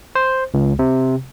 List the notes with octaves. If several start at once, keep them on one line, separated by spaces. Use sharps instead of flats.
C5
C#2
C3